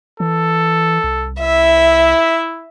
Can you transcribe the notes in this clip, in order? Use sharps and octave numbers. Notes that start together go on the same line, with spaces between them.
E3 A4
C2
E4 E5